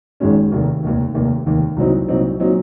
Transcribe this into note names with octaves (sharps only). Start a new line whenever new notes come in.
G#1 G#2 D#3 G#3 C#4
F1 D#2 D#3 A#3
F1 D#2 D#3 A#3
F1 D#2 D#3 A#3
F1 D#2 D#3 A#3
C2 A#2 F#3 C4 D#4
C2 A#2 F#3 C4 D#4
A#2 F#3 C4 D#4